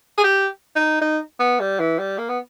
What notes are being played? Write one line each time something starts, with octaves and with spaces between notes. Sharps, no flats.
G#4
G4
D#4
D#4
B3
G3
E3
G3
A#3
B3